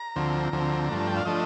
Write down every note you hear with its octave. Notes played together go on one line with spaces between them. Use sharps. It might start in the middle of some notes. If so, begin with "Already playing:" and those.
Already playing: A#5
D2 D3 F3 C4
D2 D3 F3 C4
G2 F3 A3 D4
A#5
G5
F5
F3 A3 D4 D#5